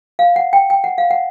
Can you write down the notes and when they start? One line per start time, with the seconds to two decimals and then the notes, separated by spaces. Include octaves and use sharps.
0.19 F5
0.36 F#5
0.53 G5
0.70 G5
0.84 F#5
0.98 F5
1.11 F#5